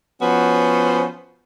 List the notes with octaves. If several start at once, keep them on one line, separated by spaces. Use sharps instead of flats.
F3 B3 C#4 F#4 C5